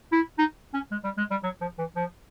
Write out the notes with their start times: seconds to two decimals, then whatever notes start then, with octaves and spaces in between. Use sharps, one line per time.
0.12 E4
0.38 D#4
0.73 C#4
0.91 G#3
1.04 G3
1.17 G#3
1.30 G3
1.43 F#3
1.61 F3
1.78 E3
1.96 F3